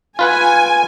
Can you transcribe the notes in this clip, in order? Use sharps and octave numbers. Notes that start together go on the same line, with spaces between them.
F4 B4 F#5 G#5